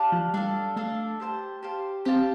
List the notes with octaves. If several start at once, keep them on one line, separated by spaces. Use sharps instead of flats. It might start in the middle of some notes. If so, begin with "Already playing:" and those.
Already playing: D4 G4 F5 A5
F3
G3 D4 A4 F5
A3 D4 A4 F5
G4 C5 F5 A5
G4 C5 F5 A5
C4 G4 F5 A5